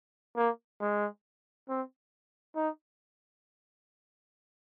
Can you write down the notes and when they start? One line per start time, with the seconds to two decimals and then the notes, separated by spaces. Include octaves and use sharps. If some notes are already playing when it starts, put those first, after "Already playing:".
0.36 A#3
0.81 G#3
1.68 C4
2.55 D#4